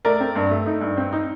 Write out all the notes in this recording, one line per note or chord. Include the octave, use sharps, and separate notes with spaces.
A3 A#4 D5
C4
G2
A3
D#4
G2
C4
D#4